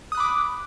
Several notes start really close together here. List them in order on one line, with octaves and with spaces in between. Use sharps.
D#6 F#6 B5 D6